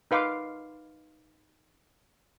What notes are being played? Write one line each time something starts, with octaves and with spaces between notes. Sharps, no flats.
D#4 B4 F5 C6 D6